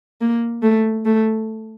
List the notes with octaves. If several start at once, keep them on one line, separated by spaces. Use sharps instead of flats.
A#3
A3
A3